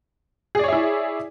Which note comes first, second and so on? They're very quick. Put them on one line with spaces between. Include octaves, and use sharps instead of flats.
G#4 D5 C#5 E5 E4